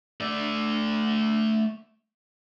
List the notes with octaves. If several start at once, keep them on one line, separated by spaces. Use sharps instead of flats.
A3 D5